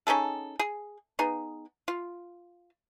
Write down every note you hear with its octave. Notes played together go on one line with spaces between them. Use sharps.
C#4 D#4 G#4 A4
G#4
B3 D#4 G#4
F4